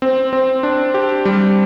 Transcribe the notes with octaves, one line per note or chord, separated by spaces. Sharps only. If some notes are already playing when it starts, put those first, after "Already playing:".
C4
C4
D4
G4
G3